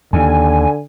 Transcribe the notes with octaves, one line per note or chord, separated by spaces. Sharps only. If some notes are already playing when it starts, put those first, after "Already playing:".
D#2 D3 G#5